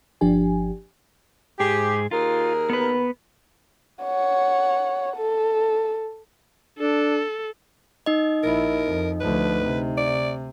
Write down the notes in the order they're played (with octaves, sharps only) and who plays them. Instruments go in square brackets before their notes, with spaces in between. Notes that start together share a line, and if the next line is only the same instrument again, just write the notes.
[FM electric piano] G1 F3 D4 G4 G#5
[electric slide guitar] G#2 G#4 [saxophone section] G4
[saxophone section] D#2 G#4 A#4 [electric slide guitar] F4
[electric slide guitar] B3 B4
[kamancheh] C#5 F#5
A4
[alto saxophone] D4 [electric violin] A4
[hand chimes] D#4 D#5
[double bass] A#1 E4 [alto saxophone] A#4
[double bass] F2
[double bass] D2 F3 [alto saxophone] B4
[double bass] C3
[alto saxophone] D5